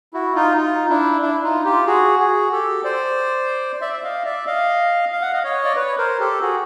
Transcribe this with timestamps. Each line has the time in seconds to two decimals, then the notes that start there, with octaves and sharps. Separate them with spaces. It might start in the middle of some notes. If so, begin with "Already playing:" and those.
0.14 E4 F#4
0.35 D#4 F4
0.57 D#4 F4
0.89 D4 E4
1.22 D4 E4
1.43 D#4 F4
1.65 F4 G4
1.87 F#4 G#4
2.19 F#4 G#4
2.52 G4 A4
2.84 C5 D5
3.81 D5 E5
3.93 E5
4.03 D#5 F5
4.25 D5 E5
4.47 D#5 F5
5.12 F5
5.22 F#5
5.33 D#5 F5
5.44 C#5 D#5
5.65 D5
5.76 B4 C#5
5.98 A#4 C5
6.19 G4 A4
6.41 F#4 G#4